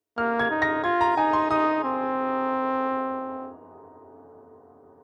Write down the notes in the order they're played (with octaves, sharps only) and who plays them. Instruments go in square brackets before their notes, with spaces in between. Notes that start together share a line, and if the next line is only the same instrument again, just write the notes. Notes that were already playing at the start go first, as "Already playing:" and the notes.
[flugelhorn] A#3 [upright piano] F6
[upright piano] G#6
[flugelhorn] D#4
[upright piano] A#6
[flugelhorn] F4 [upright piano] G#6
[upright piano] A#5
[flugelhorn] D#4 [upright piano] G#5
[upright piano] C6
[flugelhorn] D#4 [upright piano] D#6
[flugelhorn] C4